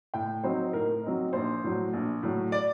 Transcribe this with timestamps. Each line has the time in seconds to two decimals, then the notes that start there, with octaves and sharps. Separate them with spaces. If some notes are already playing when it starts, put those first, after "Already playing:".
0.14 A2 G5
0.44 F#3 C4 D#4 C5
0.73 A2 A#4
1.03 F#3 C4 D#4
1.33 A#1 C5
1.64 A2 F#3
1.93 A#1
2.23 A2 F#3
2.52 D5